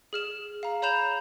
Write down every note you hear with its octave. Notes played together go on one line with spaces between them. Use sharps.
G#4 F6 E7
F5 A#5
C#5 A#5 B5 G6 E7 F7